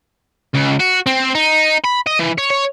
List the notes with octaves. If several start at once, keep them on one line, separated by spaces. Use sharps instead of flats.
C#2
F#4
C4
D#4
B5
D#5
E3
C#5
C#5